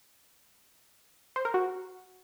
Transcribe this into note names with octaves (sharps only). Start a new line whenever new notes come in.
C5
A#4
F#4